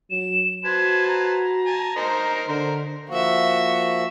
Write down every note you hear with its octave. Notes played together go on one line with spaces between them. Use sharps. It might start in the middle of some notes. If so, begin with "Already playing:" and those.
F#3 E7
F#4 B4 C5 A5 G#6
A#5
G#5 A5
D#4 A#4 C5
D3 A#4 C5
F3 A#3 F#4 E5